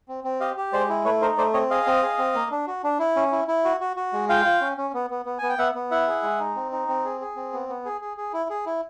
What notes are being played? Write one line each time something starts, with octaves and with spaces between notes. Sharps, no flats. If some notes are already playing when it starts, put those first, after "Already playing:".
C4
C4
G4 D#5 F5
G4
G#3 C5 D5
E4
A3 B4 C#5
D#4 A#4 C5
A3 C5 D5
C4 C#5 D#5
G#4 D#5 F5
C4
G#4
C4
A#3
D4
F#4
D4
E4
C#4
E4
E4
F#4
F#4
F#4
G#3
F4 F5 G5
F4
C#4
C#4
B3
B3
B3
B3 G#5
G5
B3 E5 F#5
B3
E4 E5 F#5
G#4
G#3
D#4
C4
D#4
C4
G#4
G#4
C4
B3
B3
G#4
G#4
G#4
E4
G#4
E4